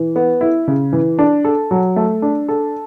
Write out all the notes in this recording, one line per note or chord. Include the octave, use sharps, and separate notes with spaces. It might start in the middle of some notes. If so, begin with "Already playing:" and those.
Already playing: E3
B3
E4
C#3
E3
D4
A4
F#3
A3
D4
A4